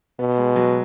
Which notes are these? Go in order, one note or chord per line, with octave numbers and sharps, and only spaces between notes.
B2 B3
G#3
F#3